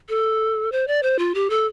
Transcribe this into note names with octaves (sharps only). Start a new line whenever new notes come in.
A4
C5
D5
C5
F4
G4
A4